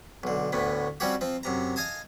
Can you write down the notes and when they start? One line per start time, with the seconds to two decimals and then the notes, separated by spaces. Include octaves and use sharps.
0.23 B1 D3
0.52 D2 A2 B3
1.00 F3 G3 C4 C#4 F#4 G4
1.21 F3 C4
1.43 F#2 C3 A#5
1.76 D#5 F5 G#5 A5 D#6